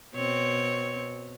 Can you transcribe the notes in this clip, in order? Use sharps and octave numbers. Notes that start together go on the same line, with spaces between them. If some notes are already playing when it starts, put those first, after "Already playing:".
B2 C4 C#5